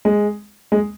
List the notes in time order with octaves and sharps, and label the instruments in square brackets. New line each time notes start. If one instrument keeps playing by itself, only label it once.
[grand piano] G#3
G#3